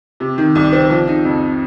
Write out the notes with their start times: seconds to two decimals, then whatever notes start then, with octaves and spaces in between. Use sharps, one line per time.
0.20 C3
0.38 D#3
0.55 C2
0.73 C4
0.90 F3
1.07 D#4
1.25 F2